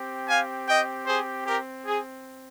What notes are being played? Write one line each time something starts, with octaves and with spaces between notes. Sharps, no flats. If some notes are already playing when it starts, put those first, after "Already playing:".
Already playing: C4 G4
F5 G#5
D#5 G5
G#4 C5
G4 A#4
G#4